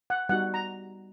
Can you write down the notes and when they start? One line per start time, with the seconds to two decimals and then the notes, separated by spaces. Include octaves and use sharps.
0.10 F#5
0.29 G3 B3 D#4 F#4 F#5
0.54 A#5